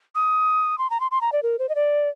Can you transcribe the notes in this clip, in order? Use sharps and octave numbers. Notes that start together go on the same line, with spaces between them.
D#6
C6
A#5
C6
C6
A#5
D5
A#4
C5
D#5
D5